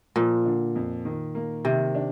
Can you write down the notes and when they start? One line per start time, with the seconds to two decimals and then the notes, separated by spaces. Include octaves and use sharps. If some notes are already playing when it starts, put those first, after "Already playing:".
0.16 A#2 F3
0.45 D3
0.76 F2
1.05 D#3
1.35 A#3
1.65 C3 D#3
1.95 D4